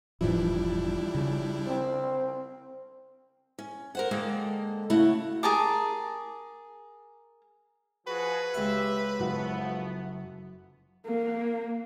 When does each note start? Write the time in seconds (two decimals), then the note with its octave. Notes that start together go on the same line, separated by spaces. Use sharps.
0.21 E1 A2 E3 F3 G3 D4 E4
1.15 C#3
1.67 C4
3.59 C#4
3.95 A#4 C5 F#5
4.11 D3 G#3 A#3 A4 G5
4.90 C#3 A3 E4 F#4
5.43 G#4 A#4 A5 D6
8.07 F3 F#4 G#4 B4
8.54 C#2 G4 E5 B5
9.19 F#1 F3 A3 B3 F#4
11.07 A#3